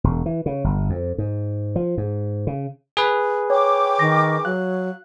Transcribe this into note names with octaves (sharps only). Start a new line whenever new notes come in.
E1
E3
C#3
G1
F2
G#2
F3
G#2
C#3
G#4 B4
C#5 G5 D6
D#3 C#6 A#6
F#3 F5 F#6